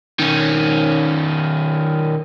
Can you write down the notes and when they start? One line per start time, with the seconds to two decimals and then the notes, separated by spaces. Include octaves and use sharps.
0.20 D#3 C#4